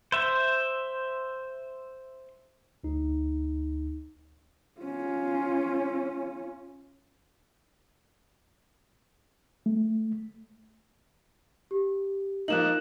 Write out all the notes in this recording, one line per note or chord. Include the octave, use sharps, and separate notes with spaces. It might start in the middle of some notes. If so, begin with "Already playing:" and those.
C5 E5
D2 D#4
C#4 F4
A3
G4
F3 A#3 D#4 F#6 E7 F#7